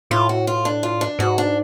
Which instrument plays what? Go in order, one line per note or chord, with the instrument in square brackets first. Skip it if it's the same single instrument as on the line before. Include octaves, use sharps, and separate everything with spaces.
[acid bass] A2 [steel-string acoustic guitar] F4
[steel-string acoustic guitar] F#4
F4
D4
F4
D4
[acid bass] G#2 [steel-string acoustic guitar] F#4
[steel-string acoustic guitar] D4